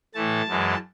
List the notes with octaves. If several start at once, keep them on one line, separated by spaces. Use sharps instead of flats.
A2 E3 A3 A5
F#2 E3 G#3